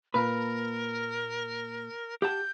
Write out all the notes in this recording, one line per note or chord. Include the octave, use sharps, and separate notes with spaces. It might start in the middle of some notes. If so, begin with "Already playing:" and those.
A#2 A#4 B4
G4 F#5 A5 G6